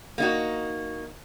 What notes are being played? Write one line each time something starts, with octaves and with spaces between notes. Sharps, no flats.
A#3 D#4 F#4